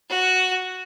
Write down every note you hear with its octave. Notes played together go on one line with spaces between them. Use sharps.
F#4